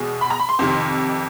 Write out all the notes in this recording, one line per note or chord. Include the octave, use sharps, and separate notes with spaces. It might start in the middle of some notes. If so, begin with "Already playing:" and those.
Already playing: E2 B2 G#3
B5
A#5
B5
C6
F2 C3 D#3